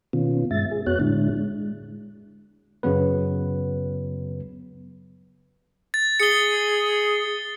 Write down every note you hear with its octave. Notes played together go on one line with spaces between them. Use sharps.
B2 D#3 B3 C#4 F4
G2 G#3 E5 A6
G#4
F2 B3 F#4 C#5 F#6
A2 D3 G#3 D4 E4
G#3
F#2 C#3 F#3 B3 B4
A6
G#4 C#7 G7